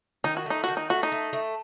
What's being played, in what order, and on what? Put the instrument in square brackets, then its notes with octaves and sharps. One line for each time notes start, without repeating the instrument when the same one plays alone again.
[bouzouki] D#3 [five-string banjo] D#4
[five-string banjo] F#4
[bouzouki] A3 [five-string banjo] D#4
[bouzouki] D#3 [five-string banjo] F#4
[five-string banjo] D#4
[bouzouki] A3 [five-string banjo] F#4
[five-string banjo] D#4
[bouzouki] A3
A3